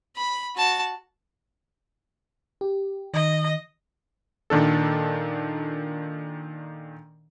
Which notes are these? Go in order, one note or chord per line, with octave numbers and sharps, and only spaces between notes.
B5
F#4 A5
G4
D#3 D#5
A#2 D#3 D4 A4